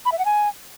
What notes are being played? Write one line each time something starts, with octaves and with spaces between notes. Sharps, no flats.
B5
E5
F#5
G#5